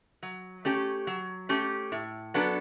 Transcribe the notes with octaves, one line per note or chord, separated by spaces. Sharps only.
F#3
A3 C#4 G4
F#3
A3 C#4 G4
A2
F#3 B3 D4 A4